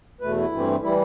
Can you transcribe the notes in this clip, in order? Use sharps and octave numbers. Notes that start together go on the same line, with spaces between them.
E2 B2 A3 B4
E4
G2 E3 A3 C4
E3 G3 E4